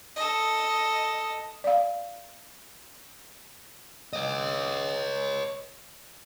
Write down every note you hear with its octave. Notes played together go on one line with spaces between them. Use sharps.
A4 D#5
D5 F5
C#5 D#5